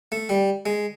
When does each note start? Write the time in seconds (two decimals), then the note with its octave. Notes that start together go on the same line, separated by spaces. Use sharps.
0.12 A3
0.29 G3
0.66 G#3